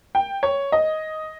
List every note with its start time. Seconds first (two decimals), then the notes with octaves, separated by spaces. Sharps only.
0.15 G5
0.43 C#5
0.72 D#5